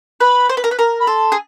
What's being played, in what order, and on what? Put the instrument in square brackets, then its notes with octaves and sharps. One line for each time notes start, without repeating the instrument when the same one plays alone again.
[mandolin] B4 [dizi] B5
[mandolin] C5
B4
A#4
B4
A#4
[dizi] B5
[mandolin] A4 [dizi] C6
[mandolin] G#4